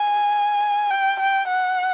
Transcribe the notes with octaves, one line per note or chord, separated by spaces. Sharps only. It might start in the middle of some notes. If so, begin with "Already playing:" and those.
Already playing: G#5
G5
G5
F#5